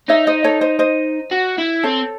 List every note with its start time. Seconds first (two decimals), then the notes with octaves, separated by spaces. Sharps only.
0.09 D#4 C#5 E5
0.27 C5 D#5
0.44 A4 C#5
0.61 C5 D#5
0.79 C5 D#5
1.31 F#4
1.58 E4
1.83 C4 A4 C#5